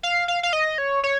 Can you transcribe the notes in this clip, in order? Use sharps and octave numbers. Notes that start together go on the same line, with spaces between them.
F5
F5
F5
D#5
C#5
C#5